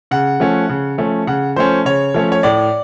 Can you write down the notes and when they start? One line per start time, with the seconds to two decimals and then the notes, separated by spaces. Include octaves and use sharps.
0.11 C#3 F#5
0.40 F3 A3 C#4
0.69 C#3
0.98 F3 A3 C#4
1.27 C#3 F#5
1.56 F3 A3 C#4 C5
1.85 C#3 C#5
2.14 F3 A3 C#4
2.32 C#5
2.43 A2 D5